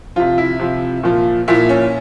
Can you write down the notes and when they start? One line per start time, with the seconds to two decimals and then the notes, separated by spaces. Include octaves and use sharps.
0.16 C3 F3 F4
0.38 E4
0.59 C3 F3
1.03 A#2 F3
1.48 A#2 F3 E4
1.69 C#4